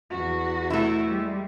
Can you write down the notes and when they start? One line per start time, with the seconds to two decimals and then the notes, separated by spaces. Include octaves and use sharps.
0.11 E2 F#4
0.70 A3 E4
1.06 G3 G#3